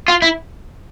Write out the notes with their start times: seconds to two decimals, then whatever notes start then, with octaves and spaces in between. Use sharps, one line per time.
0.08 F4
0.22 E4